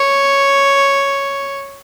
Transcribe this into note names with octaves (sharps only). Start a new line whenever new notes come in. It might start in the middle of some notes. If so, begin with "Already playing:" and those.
Already playing: C#5